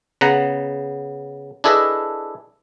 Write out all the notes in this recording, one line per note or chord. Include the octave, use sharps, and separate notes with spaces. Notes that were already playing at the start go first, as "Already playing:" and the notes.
C#3 B3 F#5 A#5
D4 E4 G#4 A4 B4 D#5